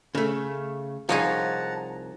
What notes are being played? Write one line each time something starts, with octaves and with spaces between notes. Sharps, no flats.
C#3 A3
C2 F3 D#4 G#4 C#5 F#5 A5 A#5